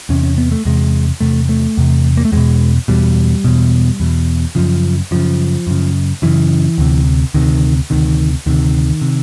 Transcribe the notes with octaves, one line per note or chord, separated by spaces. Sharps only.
E2 C3 C#4
C#4
B3
A3
E2 C3 G#3
E2 C3 A3
A3
E2 C3
A#3
A3
E2 B2 G#3
E2 B2 G3
E2 B2
E2 B2
F#2 C#3 F3
F#2 C#3 F3
F#2 C#3
F#2 C#3 E3
D2 C3
D2 C3 D#3
D2 C3 D#3
D2 C3 D#3
C3